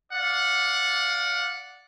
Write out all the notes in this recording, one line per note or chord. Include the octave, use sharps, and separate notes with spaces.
D5 F5 F#5